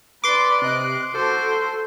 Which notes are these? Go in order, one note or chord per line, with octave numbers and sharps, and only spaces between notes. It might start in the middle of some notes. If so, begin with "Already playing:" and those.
B4 D5 C6 D6
C3 D#5 F#6 D7
F#4 A4 C5